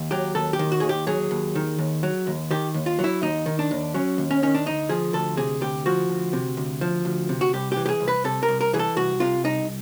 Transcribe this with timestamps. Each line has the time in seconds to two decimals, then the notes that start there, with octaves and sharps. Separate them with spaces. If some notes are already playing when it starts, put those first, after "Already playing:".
Already playing: D#2
0.11 F#3 G4
0.35 D#2 A4
0.53 G4
0.59 D#3
0.72 F#4
0.80 D#2 G#4
0.89 G4
1.07 F#3 G#4
1.31 D#2
1.55 D#3
1.79 D#2
2.03 F#3
2.27 D#2
2.51 D#3 G4
2.74 D#2
2.86 F4
2.99 F#3
3.04 E4
3.22 D#2 D#4
3.46 D#3
3.59 D4
3.71 D#2
3.94 F#3 C#4
4.18 D#2
4.31 C#4
4.43 D#3 C#4
4.54 D4
4.66 D2 D#4
4.89 F3 G#4
5.13 D2 A4
5.37 C3 G#4
5.61 D2 G4
5.86 F3 F#4
6.09 D2
6.33 C3
6.57 D2
6.81 F3
7.05 D2
7.29 C3
7.41 F#4
7.53 C2 G4
7.72 G4
7.77 E3
7.86 G4
7.89 G#4
8.01 C2
8.08 B4
8.24 C3 A4
8.43 A#4
8.48 C2
8.61 A#4
8.73 E3 G#4
8.79 A4
8.96 C2 F#4
9.20 C3 F4
9.44 C2 D#4